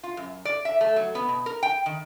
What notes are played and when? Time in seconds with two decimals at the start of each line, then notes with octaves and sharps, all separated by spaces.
0.03 F4
0.17 F#2
0.45 D5
0.65 E5
0.81 A3
0.96 F#3
1.15 B3
1.29 B2
1.46 A#4
1.63 G5
1.86 D#3